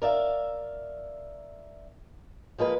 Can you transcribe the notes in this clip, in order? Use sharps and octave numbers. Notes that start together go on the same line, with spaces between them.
A#4 D5 E5 F5
F3 G#3 A#3 B4